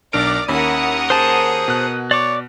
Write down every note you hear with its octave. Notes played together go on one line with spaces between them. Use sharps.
B1 D4 A#4 D5 D6 D7
D#2 C#4 E4 A#4 F#5 D#6
G#4 C5 A5
B2 F#6
C#5 D5 D6